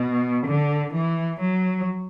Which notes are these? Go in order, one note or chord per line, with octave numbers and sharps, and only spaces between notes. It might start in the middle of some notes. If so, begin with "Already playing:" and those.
Already playing: B2
D3
E3
F#3